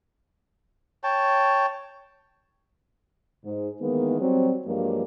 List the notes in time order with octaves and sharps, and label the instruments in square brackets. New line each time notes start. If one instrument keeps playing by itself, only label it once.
[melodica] C#5 G5 A5
[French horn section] G#2
D#3 E3 G#3 A#3 B3
F#3 G3 C4
G2 F3 F#3 G#3 A#3